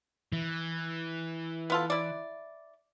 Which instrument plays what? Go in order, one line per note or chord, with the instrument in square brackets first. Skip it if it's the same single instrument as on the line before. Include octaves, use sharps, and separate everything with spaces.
[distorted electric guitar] E3
[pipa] B3 F4 A4
E4 D5